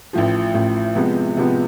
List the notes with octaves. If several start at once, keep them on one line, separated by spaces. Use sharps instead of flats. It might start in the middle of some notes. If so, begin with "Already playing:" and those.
A1 A2 F3
A1 A2 F3
C3 F3 G#3 B3
C3 F3 G#3 B3